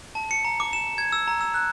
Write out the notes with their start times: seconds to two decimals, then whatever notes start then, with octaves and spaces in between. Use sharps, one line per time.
0.15 A5
0.31 C#7
0.45 A#5
0.60 D6
0.73 E7
0.98 G#6
1.12 E6
1.28 A#5
1.41 E6
1.54 F#6